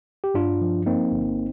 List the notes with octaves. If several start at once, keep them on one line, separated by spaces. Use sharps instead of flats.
G4
G2 D4 F4
F3
A#3 C4 D#4
G1